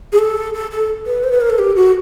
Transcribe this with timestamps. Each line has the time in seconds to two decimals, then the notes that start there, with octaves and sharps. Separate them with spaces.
0.13 G#4
0.19 A4
0.54 A4
0.71 A4
1.06 B4
1.24 C5
1.31 B4
1.41 A#4
1.50 A4
1.59 G4
1.76 F#4